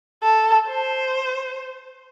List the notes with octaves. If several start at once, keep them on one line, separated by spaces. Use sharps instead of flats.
A4
C5